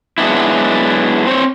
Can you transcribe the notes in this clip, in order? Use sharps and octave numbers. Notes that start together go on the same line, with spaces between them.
F#3 G#3 B3 D4 E4
C4 C5 C#5